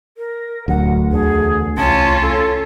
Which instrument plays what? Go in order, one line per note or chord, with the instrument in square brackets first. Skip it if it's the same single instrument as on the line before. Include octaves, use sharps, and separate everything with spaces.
[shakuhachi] A#4
[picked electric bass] D1 F#3 [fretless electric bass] D2 [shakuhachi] F#5
[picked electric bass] E2 D3 [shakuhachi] G#4
[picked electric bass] C2 [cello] C#4 F4 [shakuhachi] A5
[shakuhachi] A4